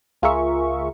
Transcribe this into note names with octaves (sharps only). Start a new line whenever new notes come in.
C#2 F4 G#4 A#4 E5 C#6